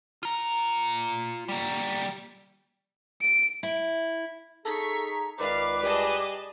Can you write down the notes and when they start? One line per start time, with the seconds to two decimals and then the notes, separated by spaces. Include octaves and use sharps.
0.23 F4 A#5
1.48 G3 A#3
3.22 D7
3.63 E4
4.65 D#4 G#4 A4 A#5 C#6 B6
5.40 C#2 D#3 B4 D5 F5 D6
5.83 G3 G#4 D#5 A5